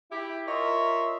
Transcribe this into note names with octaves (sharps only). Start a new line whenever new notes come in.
E4 G4
F4 A#4 C#5 D#5 E5